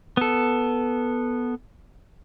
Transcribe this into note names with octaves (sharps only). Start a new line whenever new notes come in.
B3 A4